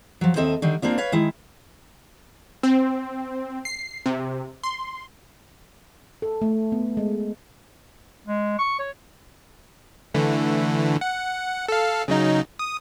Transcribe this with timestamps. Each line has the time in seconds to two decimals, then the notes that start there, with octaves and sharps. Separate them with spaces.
0.21 F3 F#3
0.36 D#2 C4 A4 D#5 E5
0.62 D3 D#3 G3
0.82 A#3 C4 D4 F4
0.98 B4 C#5 F5
1.12 D#3 G#3 E4
2.63 C4
3.65 C7
4.06 C3
4.63 C6
6.22 A4
6.42 A3
6.72 B3
6.97 G#3
8.27 G#3
8.59 C#6
8.79 C#5
10.14 D3 E3 A3
11.01 F#5
11.68 A4 F5
12.08 C#3 F#3 D#4
12.59 D#6